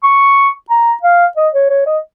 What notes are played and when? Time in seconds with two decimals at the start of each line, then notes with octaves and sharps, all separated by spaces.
0.03 C#6
0.70 A#5
1.03 F5
1.37 D#5
1.54 C#5
1.70 C#5
1.86 D#5